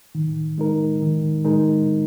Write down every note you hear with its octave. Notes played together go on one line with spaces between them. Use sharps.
D#3
G#3 D#4 A#4
D#3
G#3 D#4 A#4